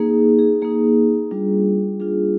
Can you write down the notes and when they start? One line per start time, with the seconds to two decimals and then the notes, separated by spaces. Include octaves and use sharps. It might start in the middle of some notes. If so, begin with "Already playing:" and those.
Already playing: A#3 D#4 G#4
0.39 G#4
0.62 A#3 D#4 G#4
1.31 G3 D4 F4
2.00 G3 D4 F4 G#4